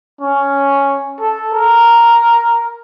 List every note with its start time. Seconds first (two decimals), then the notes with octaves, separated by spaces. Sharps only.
0.21 C#4
1.20 A4
1.53 A#4